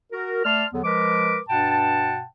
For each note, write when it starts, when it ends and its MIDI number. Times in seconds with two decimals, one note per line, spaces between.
0.12 0.43 66
0.12 0.43 70
0.45 0.65 57
0.45 0.65 74
0.45 0.65 81
0.45 0.65 84
0.45 0.65 89
0.73 0.81 40
0.73 0.81 50
0.73 0.81 54
0.73 0.81 59
0.84 1.38 53
0.84 1.38 56
0.84 1.38 70
0.84 1.38 71
0.84 1.38 86
1.48 2.24 43
1.48 2.24 47
1.48 2.24 78
1.48 2.24 79
1.48 2.24 81